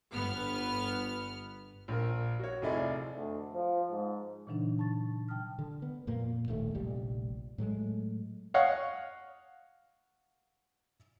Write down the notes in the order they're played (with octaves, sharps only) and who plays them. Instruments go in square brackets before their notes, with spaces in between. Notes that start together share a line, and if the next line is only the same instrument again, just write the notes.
[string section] G1 B3 F6
[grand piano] A#1 A#4
F#4 C#5
F1 F2 D#4 E4 G#4 D5
[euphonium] D2
F3
G#2
[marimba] A#2 C#3 E3 F#3 D4 D#4
A5 C#6 A6
C3 F#3 G5 A5 D#6 F6
[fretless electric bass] D3
B3
F2 A#2 A#3
D1 A#1 D#2 A3
F1 A#1 G3
A2 F#3 G#3 A3
[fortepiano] C#5 D#5 F5 F#5